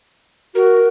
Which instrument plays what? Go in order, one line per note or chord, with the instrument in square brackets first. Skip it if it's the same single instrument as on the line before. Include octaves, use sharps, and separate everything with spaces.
[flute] F#4 [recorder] A#4